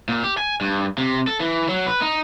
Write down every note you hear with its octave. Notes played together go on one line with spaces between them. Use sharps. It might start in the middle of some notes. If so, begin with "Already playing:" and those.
A#2
G4
G#5
G2
C3
A4
E3
F#3
B4
D#4